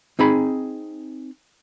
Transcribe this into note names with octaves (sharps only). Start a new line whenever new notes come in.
C4 D#4 G#4 B5